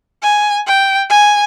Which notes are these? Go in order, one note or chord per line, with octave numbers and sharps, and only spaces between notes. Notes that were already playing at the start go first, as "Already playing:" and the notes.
G#5
G5
G#5